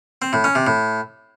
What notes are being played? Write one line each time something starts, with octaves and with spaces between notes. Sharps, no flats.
C4
A2
C#4
C3
A2